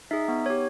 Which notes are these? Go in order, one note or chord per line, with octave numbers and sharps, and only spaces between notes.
D#4 G#4 E5
B3
D#4 G4 C#5